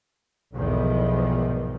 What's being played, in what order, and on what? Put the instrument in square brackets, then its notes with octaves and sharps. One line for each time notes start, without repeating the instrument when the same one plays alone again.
[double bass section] B1 E2 G#2 D#3 F3